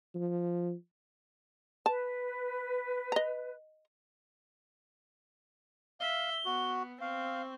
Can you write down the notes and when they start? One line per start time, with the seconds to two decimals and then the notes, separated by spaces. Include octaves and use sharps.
0.15 F3
1.86 B4 A5
3.12 D#5 A#5
6.00 E5 F5 G7
6.45 B3 F#4
7.01 C4 F5 C#6